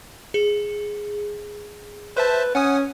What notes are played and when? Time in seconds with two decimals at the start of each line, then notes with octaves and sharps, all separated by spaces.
0.34 G#4
2.17 B4 C5 E5 A5
2.55 C#4 F#5 G#5 D#6